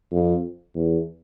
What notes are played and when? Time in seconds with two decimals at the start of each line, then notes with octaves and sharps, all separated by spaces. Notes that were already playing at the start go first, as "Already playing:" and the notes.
0.12 F2
0.75 E2